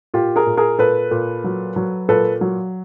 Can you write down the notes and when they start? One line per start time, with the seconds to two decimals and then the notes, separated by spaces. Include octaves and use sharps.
0.14 A#2 F4 G4
0.36 G#4 A#4
0.46 A#2
0.57 G#4 A#4
0.78 A#2 A4 B4
1.11 A#2
1.44 F#3
1.76 F#3
2.08 A#2 A4 B4
2.41 F#3